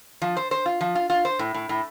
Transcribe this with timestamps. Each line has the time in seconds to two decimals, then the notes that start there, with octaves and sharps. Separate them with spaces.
0.22 F3
0.37 C5
0.51 C5
0.66 F4
0.81 F3
0.95 F4
1.10 F4
1.25 C5
1.39 A2
1.54 A2
1.69 A2